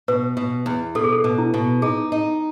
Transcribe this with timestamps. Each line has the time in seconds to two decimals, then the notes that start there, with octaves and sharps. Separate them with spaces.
0.08 B2 B4
0.37 B2
0.66 E2
0.95 B2 A4
1.04 G#4
1.12 A4
1.24 B2
1.38 E4
1.54 B2
1.82 D#4 G#4
2.12 D#4